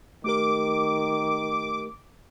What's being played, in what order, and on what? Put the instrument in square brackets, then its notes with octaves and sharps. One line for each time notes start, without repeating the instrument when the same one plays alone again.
[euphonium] D#3 [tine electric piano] A3 G4 A#4 [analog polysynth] D6